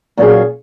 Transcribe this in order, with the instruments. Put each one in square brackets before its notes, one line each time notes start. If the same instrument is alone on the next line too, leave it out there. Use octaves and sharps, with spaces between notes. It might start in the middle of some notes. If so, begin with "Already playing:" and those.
[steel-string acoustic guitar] A#2 F#3 C#4 F4 G#4